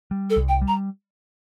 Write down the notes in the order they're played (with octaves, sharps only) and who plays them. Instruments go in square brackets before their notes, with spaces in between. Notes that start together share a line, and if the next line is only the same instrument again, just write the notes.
[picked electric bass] G3
[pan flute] A4
[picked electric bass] C2
[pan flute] G5
[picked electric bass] G3
[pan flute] A#5